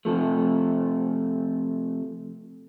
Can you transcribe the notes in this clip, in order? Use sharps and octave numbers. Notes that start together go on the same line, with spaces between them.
C3 F3 A3